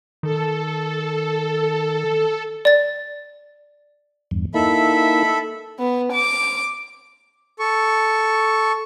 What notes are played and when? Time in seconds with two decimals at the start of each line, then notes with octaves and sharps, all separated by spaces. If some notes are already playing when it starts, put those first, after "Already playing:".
0.23 D#3 A4
2.65 D5 A6
4.31 E2 G2
4.54 A#3 D#4 E4 A4 E5 B5
5.79 B3
6.13 D6
7.59 A4 C#6